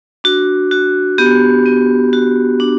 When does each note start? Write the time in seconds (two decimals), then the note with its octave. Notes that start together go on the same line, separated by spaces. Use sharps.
0.24 D4 F#4
0.71 F#4
1.18 B3 G4
1.66 B3
2.13 F#4
2.60 D4